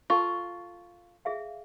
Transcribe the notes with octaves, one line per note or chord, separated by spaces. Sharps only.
F4 A4 A5 C#6
G#4 E5 F5